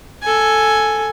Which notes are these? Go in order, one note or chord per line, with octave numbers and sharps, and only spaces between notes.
A4 G#5